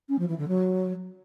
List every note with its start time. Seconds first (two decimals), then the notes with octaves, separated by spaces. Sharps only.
0.09 C#4
0.19 F3
0.28 E3
0.38 D3
0.48 F#3